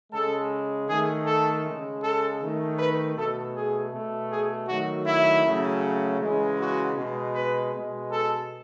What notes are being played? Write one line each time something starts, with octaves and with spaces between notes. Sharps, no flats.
C#3 G#3 A4
D#3 A3 G#4
A4
C#3 G#3
A4
D#3 A3
B4
B2 A3 A4
G#4
B2 A3
G#4
D#3 F#3 A3 F#4
E4
C#3 F#3 A3
C#3 E3 G#3
F#4
B2 G#3
B4
B2 G#3
A4